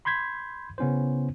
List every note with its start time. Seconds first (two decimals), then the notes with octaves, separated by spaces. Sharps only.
0.05 B5 C6 G6 G#6 B6
0.78 C#3 B3 C#4 E4 C5